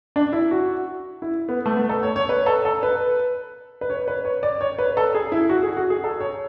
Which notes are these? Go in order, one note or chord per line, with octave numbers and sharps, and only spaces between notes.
D4
E4
F#4
E4
B3
A3
B3
A4
C#5
C#5
B4
A4
A4
B4
B4
C#5
B4
C#5
D5
C#5
B4
A4
G#4
E4
F#4
G#4
F#4
G#4
A4
C#5